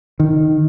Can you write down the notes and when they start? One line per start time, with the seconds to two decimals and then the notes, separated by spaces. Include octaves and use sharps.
0.20 D#3